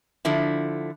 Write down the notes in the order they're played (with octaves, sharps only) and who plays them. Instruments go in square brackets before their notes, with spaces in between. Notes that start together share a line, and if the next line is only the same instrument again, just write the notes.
[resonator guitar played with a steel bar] D3 F3 E4